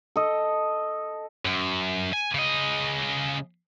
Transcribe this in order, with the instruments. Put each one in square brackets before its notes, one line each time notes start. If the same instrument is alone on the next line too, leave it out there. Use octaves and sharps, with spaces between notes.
[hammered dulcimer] A4 D#5
[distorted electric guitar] F#2
G#5
C#3 D#5